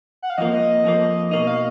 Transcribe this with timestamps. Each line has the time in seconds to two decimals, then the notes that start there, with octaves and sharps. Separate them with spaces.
0.22 F#5
0.30 F5
0.38 F2 F3 A#3 D#5
0.84 F2 F3 A#3
1.31 B2 A#3 D#4 D#5
1.47 F5